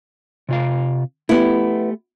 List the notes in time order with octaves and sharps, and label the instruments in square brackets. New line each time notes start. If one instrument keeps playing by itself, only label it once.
[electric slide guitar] C3 F4 F5
[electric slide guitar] A3 G4 [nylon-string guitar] B3 E4